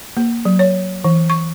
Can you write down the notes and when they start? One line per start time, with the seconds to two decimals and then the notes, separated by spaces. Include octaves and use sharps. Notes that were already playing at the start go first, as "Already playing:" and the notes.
0.17 A#3
0.45 F#3
0.59 C#5
1.04 E3
1.30 C#6